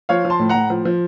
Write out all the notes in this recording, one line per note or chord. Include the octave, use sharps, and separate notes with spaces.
F3 C#5 F5
F3
A5 C6
A2
A2 F#5 A#5
F3
F3